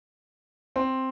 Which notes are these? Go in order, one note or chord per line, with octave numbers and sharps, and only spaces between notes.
C4